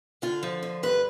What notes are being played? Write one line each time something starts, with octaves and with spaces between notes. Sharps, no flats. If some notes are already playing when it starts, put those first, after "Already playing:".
D3 F4
F3
D3
G2 B4